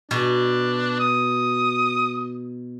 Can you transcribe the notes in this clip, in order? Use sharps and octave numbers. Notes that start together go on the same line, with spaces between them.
B2 D4
D#6